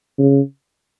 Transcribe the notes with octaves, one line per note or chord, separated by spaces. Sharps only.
C#3